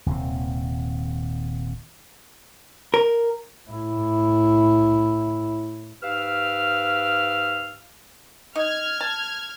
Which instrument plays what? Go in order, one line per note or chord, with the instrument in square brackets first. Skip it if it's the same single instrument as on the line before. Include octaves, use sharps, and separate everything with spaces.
[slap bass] D#1 D#2 C3 C4
[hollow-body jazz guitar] A#4
[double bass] A2 E4
[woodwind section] G#2 G4 B4 F5 E6 F6
[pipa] D#4 [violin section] F6 G#6
[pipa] A5